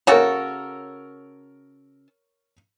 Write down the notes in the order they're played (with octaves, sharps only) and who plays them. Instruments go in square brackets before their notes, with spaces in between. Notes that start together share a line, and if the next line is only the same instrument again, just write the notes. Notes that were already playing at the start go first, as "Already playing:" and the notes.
[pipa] C#3 F#4 A4 [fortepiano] A#4 C#5